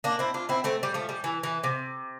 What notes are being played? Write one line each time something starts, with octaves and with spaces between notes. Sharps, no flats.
A#3 D4
C4 E4
D4 F4
C4 E4
A3 C4
G3
F3 A3
G3
E3
E3
C3